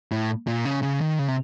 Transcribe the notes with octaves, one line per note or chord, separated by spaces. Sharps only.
A2
A#2
C#3
C#3
D#3
C#3
C3